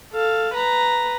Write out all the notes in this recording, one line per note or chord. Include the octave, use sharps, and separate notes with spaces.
A4 F5
B4 A#5